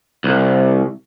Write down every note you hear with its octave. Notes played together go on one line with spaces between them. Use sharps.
C2